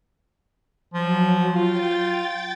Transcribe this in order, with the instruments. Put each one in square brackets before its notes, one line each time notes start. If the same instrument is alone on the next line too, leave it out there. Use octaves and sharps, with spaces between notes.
[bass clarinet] F3 [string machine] F#3
[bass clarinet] F4 [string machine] G5 A6